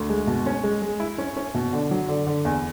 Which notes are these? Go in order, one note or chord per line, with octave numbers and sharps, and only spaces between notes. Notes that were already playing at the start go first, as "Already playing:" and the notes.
Already playing: D2
G#3
B2
C#4
G#3
G#3
E4
C#4
C#4
B2
D3
F#3
D3
D3
E2